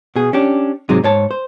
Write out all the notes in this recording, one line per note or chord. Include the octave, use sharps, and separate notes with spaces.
B2 G#4
C#4 D4 G4
G#2 C3 F#3 G#3 D#4
G#2 C#5 A5
C5